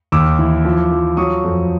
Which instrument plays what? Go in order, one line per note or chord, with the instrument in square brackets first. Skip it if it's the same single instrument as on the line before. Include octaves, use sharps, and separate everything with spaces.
[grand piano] D#2 D6 E6
E3
F3
F3
F#3 C#6 D#6
F2